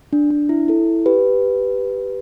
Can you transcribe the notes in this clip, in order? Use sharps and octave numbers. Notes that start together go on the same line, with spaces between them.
D4
D4
E4
E4 A4
G4 B4